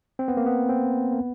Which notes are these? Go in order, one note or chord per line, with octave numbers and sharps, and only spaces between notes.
C4
B3
A#3
B3
C4
A#3
B3